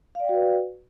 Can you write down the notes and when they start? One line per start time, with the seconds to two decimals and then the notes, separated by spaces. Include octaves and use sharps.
0.15 F5
0.20 D5
0.24 G5
0.29 F#4
0.34 B4